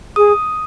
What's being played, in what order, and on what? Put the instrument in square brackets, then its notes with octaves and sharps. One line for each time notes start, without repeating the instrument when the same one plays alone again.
[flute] G#4 [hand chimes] D#6